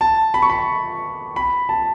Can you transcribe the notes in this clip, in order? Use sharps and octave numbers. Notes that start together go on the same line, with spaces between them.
A5
B5
C#6
B5
B5
A5